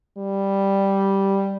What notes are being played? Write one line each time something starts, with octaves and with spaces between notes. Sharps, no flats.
G3